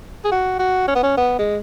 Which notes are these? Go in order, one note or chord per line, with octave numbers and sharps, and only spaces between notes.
G#4
F#4
F#4
C#4
B3
C#4
B3
G#3